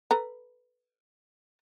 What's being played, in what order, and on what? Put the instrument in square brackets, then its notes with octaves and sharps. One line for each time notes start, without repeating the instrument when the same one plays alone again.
[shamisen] A4 B4 A#5